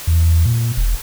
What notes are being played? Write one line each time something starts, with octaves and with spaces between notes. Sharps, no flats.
E2
A#2
E1